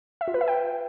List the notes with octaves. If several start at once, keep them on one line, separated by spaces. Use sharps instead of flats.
E5
F4
B4
E5
G5